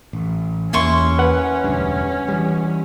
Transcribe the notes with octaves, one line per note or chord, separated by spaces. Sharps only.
A1
E2 A#3 C#4 E4 C6 C#6
B4 F#5
E1 D2 G2
E3 G3